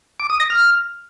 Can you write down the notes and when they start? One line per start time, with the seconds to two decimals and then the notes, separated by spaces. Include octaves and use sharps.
0.20 D6
0.30 D#6
0.40 A#6
0.50 F6